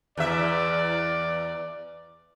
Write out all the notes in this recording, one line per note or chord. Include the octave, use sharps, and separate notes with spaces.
E2 D5 E5